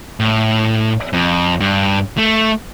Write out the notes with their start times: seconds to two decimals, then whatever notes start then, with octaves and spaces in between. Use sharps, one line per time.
0.20 A2
1.13 F2
1.60 G2
2.17 A3